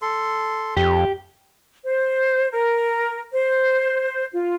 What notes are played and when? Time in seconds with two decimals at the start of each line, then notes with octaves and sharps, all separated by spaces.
0.02 A4 C6
0.77 F2 G4
1.86 C5
2.51 A#4
3.31 C5
4.34 F4